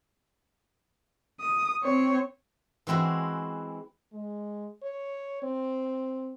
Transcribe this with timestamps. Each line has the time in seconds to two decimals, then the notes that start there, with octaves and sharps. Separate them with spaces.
1.40 D#6
1.84 C4 C#5
2.87 E3 G#3 C4 E4 F#4
4.13 G#3
4.83 C#5
5.42 C4